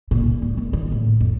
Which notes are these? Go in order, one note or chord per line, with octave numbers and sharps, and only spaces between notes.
C2 A#2
G#2
G#1
D#3
A2
F2